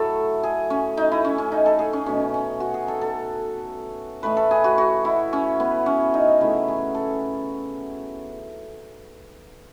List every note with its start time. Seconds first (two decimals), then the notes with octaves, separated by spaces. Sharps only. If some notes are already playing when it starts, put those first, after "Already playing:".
Already playing: A2 F#3 A3 A4
0.43 G#4
0.70 C#4
0.97 D#4
1.12 E4
1.25 C#4
1.38 C#4
1.52 D#4
1.66 A4
1.79 G#4
1.93 C#4
2.06 B2 A3 C#4
2.34 C#4
2.60 F#4
2.74 G#4
2.88 A4
3.01 A4
4.23 A2 E3 A3 B4
4.37 A4
4.51 G#4
4.64 F#4
4.78 F#4
5.05 E4
5.33 C#4
5.60 B3
5.86 C#4
6.14 D#4
6.40 C#3 E3 A3 E4
6.68 G#4
6.95 A4